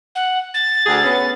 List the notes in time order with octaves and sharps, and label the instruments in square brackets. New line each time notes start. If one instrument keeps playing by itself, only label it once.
[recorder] F#5
A6
[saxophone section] D2 G#4
B3 C#4